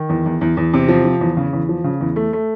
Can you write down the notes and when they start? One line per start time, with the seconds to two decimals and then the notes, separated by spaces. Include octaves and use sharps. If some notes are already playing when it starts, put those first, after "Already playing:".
Already playing: D#3
0.09 E2
0.26 E2
0.41 E2
0.57 E2
0.74 C3
0.88 F3
1.05 F3
1.21 E2
1.37 C#3
1.53 E2
1.69 F3
1.84 C#3
2.01 E2
2.16 A3
2.33 A3